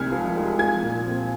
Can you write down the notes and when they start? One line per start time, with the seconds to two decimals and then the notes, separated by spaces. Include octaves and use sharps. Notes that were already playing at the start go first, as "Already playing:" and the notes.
Already playing: C2 C3 G#3 G#5 F6 G#6
0.12 F3
0.36 G#3
0.59 F3 G#5 G#6
0.83 A#2
1.06 C4